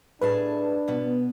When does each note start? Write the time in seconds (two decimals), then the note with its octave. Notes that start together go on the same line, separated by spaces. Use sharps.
0.21 A2 D4 G#4 B4 A5
0.88 B2 B3